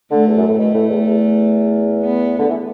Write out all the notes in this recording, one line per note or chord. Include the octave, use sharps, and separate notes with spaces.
D3 A3
E2
F#2
A2
B2 A3
A2
E2
E2
B3
D3
E3